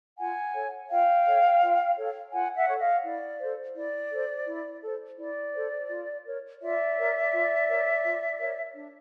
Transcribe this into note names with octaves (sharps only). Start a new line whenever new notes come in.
F4 F#5 G#5
A4 C#5
F4 F5 G5
A4 C#5
F4
A4 C#5
F4 F#5 G#5
E5 F#5
A4 C#5
D#5 F5
E4 D5
A4 C5
E4 D5
A4 C5
E4
A4 C5
E4 D5
A4 C5
F4
A#4 C#5
F4 D5 E5
A#4 C#5
F4
A#4 C#5
F4
A#4 C#5
D4